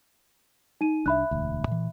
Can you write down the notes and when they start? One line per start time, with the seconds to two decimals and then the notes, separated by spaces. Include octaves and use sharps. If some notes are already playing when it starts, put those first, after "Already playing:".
0.81 D#4 D#7
1.06 C2 D4 E5 B5 F#6
1.31 E1 D2
1.68 A#2 E3